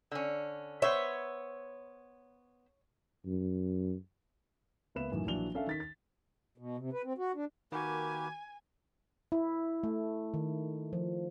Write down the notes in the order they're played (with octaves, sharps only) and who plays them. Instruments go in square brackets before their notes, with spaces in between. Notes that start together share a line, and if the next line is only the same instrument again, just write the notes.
[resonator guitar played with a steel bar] D3 C#4
[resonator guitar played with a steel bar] B3 C5 E5 [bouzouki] C#5
[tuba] F#2
[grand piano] C#2 A#3 B3 B4 E5 E7
F#2 A2 D#3 E3
A#1 E3 F#3 D4 F7 G7
C#4 D4 A4 E5 F5
D#3 A6 B6
A6
[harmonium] B2
C3
B4
C4
F#4
D4
[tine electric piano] D#3 F#4 [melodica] A#3 G4 B4 [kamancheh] G#5
[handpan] E4
A3
D#3
F3